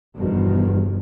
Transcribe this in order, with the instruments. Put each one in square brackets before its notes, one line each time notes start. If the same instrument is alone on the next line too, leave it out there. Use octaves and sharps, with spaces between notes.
[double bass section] G1 E2 B2 D#3 F3